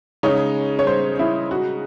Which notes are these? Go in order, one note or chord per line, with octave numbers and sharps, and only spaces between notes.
C#3 G#3 D#4 C#5
C#5
C5
E4
F#4